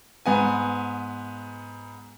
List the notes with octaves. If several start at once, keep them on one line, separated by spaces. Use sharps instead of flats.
G#2 B3 G#5